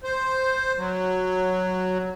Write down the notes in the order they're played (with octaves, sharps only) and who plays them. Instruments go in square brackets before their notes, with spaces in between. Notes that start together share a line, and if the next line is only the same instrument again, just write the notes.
[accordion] C5
F#3